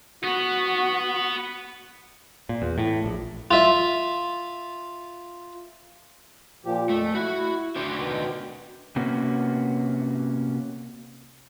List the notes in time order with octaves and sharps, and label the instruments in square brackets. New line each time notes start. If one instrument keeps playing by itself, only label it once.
[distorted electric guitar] B3 [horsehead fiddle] F#4
[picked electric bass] A#2
E2
A2
A#1
[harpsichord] F4 E5
[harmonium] A#2 F3 G4
[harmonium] F2 [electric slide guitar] A3
[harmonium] E4 [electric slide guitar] F#4
[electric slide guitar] D4 F#4 C5
[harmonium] B2 D#3
[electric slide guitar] C3 A#3 B3 C#4 F#4